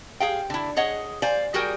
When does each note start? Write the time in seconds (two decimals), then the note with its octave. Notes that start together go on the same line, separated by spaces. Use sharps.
0.20 G#4 F5 G5
0.50 D3 E4
0.77 G#4 C#5 D#5 F#5
1.22 C5 D5 F5 G#5
1.54 G3 F#4 G#4 A#4 G5